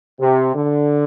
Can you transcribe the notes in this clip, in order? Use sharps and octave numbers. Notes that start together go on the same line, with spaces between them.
C3
D3